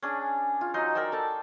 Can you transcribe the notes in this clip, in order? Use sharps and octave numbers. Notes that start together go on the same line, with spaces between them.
C#4 D4 G#4
F4
F#3 D#4 F#5 C6
A#4 D5 G5 E6
A4 A5